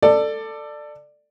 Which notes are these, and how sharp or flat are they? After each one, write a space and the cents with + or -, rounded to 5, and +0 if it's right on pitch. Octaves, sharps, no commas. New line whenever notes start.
A4 +15 D5 +15